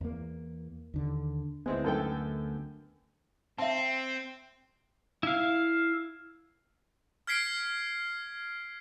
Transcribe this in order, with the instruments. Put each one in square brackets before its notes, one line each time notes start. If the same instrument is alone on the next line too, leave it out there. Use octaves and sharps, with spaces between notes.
[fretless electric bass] E2 A#3
D#2 D3
[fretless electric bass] D2 B3 [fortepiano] G#3 C4 E4
[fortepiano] F#2 A4 G5
[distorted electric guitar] C4 [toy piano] E5 A5
[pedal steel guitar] E4 F5
[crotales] F6 G#6 B6 C7 D7